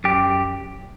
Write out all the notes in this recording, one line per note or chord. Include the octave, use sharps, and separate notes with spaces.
F#2 G4